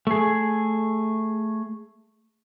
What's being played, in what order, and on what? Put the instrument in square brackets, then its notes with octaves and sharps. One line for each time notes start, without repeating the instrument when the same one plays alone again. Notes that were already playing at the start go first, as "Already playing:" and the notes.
[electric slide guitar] A3 G#4